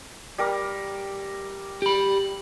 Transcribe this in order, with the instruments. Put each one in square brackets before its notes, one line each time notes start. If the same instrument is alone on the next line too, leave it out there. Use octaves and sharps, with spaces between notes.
[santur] G3 A#4 D6
[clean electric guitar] G4 B5